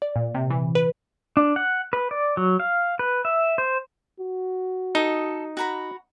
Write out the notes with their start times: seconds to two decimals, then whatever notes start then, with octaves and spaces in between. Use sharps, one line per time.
0.02 D5
0.16 A#2
0.35 C3
0.50 E3
0.75 B4
1.37 D4
1.56 F#5
1.93 B4
2.11 D5
2.37 F#3
2.60 F5
2.99 B4
3.25 E5
3.58 C5
4.20 F#4
4.95 D#4 A4 D#5
5.57 F#4 A#5 B5